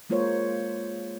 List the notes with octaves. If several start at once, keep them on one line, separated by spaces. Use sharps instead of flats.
G#3 A#3 F4 A#4 C5 C#5